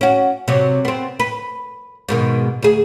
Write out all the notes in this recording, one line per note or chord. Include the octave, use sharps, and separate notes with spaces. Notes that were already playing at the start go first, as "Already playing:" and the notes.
C#4 F#4
C3 F#3
B3 C4
B4
G#2 B2 D#3
D2 G#4